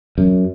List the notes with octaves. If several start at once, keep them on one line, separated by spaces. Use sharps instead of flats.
F#2